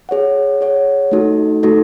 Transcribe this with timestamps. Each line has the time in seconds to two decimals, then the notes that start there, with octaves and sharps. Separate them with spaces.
0.09 G#4 C#5 F#5
0.61 G#4 C#5 F#5
1.12 A3 D#4 F#4 A4
1.63 A3 D#4 F#4 A4